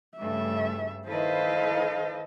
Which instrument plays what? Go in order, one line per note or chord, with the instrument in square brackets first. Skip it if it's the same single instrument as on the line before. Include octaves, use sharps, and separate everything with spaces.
[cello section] G2 C#3 A3 [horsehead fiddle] E5
[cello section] D#3 E4 B4 [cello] A4 D#5 [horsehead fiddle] C5 F5